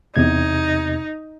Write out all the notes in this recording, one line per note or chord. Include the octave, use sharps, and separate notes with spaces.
E2 C3 D#4 G#6